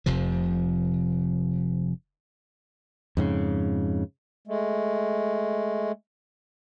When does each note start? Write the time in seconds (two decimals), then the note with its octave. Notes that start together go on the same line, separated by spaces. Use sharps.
0.06 F1 F2 C3 F3
3.17 F2 G#2 C#3
4.47 G#3 A3